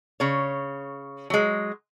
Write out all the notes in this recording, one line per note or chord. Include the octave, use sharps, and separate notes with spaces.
C#3 C#5
F#3 G#3